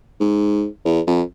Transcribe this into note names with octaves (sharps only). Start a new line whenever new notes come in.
G#2
E2
F2